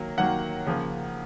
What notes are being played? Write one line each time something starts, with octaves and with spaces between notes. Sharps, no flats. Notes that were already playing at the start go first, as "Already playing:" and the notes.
Already playing: D#3 F#3 A#3
D#3 F#3 A#3 F#5
C#3 F3 A#3